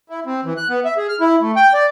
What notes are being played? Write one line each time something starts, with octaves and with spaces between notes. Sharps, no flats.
E4
C4
E3
F#6
B3
E5
G#4
F6
E4
A3
G5
D5